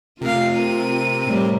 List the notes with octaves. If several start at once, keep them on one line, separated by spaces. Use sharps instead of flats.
F2 C3 A3 F4 A#4 F5
C4 A#4 A#5 D#7
A2 G3